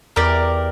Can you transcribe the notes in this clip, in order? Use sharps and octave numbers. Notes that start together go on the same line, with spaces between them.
E2 G4 A#4 D5